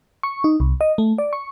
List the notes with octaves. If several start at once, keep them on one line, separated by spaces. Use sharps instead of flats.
C#6
D#4
C2
D#5
A3
D5
C#6